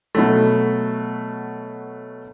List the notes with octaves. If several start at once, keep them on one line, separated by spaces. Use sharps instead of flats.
B2 F#3 A3